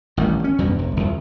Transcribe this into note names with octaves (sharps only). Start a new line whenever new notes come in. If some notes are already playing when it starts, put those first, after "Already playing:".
A1 D#3 G3
C#4
E2 G2 B2
E1
C2 F2